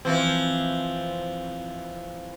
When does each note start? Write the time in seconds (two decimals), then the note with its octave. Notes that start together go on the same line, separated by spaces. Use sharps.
0.05 E3 F3 C4